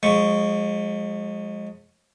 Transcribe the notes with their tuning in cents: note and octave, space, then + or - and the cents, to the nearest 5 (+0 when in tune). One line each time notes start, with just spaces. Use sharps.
F3 +45 G#3 +0 C#6 +0